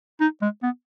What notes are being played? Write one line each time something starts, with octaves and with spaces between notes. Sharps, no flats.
D#4
G#3
B3